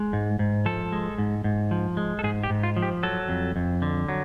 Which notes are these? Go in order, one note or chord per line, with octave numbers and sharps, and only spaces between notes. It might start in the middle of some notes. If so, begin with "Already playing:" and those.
Already playing: G#3
G#2
G#2
F3 A4
G#3
G#2
G#2
F3
G#3
A4
G#2 G#4
G4
G#2
F4
F3
G4
F#3 A4
F2
F2
D3
F#3